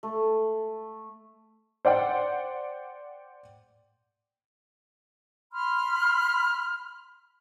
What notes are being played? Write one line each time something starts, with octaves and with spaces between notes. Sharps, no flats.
A3
C5 D5 F#5 G5
B5 C6 F6